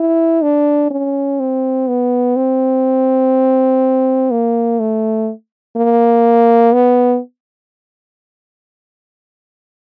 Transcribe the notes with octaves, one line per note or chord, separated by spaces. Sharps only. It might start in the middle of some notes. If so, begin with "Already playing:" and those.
Already playing: E4
D4
C#4
C4
B3
C4
A#3
A3
A#3
B3